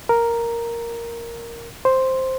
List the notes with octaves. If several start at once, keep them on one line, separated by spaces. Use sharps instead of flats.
A#4
C5